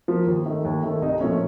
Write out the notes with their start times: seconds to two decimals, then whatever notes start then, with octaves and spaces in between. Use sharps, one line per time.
0.08 F3 A#3
0.27 D#2
0.46 D#3 A3
0.65 D#2
0.83 D#3 A3
1.02 C2 D#4
1.20 A#2 F3 A3 C#4